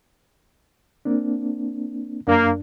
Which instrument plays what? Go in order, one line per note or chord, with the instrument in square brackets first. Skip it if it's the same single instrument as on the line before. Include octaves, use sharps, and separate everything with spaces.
[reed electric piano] A#3 C4 D4
[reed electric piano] F#2 D4 [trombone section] A#3